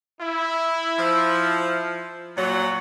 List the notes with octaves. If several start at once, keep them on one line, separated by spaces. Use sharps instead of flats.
E4
F3
A#2 F#3